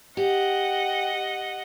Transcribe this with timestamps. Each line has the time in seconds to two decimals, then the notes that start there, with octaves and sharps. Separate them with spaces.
0.17 G4 D#5 F#5